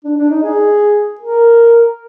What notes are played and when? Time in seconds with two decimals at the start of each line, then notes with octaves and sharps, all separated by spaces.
0.04 D4
0.18 D4
0.30 D#4
0.43 G#4
1.20 A#4